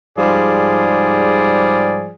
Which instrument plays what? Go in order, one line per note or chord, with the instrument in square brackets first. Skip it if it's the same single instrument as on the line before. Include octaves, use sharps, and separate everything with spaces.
[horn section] G#2 F3 G3 G#4 D5